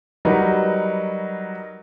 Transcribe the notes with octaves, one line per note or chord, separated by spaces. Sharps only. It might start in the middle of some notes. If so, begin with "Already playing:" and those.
F#3 G3 D#4 A#4 B4